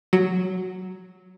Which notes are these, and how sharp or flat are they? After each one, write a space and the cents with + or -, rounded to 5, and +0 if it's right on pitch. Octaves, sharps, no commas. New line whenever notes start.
F#3 +5